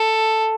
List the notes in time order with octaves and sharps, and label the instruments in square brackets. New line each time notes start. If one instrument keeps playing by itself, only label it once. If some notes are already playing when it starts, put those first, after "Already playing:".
Already playing: [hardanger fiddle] A4